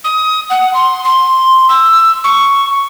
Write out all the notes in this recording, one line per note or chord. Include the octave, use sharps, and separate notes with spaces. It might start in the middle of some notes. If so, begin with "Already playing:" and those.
D#6
F#5
C6
C6
E6
C#6